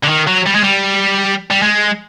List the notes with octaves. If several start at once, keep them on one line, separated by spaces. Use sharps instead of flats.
D3
D#3
F#3
G3
G#3
G3
G3
G#3